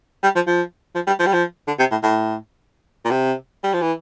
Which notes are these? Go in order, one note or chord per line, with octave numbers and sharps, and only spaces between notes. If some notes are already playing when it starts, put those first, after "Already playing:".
G3
F3
F3
F3
G3
F3
G3
F3
D3
C3
A2
A2
A#2
C3
G3
F3
E3